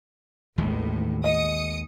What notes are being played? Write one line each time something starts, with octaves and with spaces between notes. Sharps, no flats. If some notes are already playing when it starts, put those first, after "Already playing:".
A1 D#2 A2 D#3 G#3
D#5 D#6 C#7